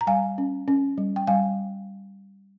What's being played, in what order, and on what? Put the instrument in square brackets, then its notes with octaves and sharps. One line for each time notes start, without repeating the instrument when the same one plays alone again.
[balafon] A#5
G3 F5 G#5
C#4
C#4
G3
G5
G3 F5 G#5